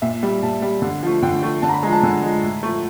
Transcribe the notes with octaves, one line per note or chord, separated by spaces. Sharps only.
A#2 E5
G3
A#2 A5
G3
D3
F3 A3
D3 G5
F3 A3
D3 A5
A#5
B5
F3 G#3 A#5
A5
D3 G#5
F3 G#3
A2
F3 A3